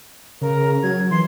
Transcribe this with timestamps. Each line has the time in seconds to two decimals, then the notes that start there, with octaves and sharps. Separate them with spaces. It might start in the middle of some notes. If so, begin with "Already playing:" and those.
0.41 C#3 A#4
0.83 F#3 G#6
1.11 E3 C6